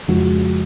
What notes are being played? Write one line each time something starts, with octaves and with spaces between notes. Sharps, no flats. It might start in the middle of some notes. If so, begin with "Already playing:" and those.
F2 C#3 F3 G#3 F#4